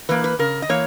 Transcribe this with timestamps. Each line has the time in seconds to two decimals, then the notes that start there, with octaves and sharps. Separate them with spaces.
0.09 E3 A#3 B4
0.24 B4
0.39 C#3 A#4
0.62 D#5
0.69 E3 A#3 C#5